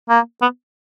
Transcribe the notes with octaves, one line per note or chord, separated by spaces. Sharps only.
A#3
B3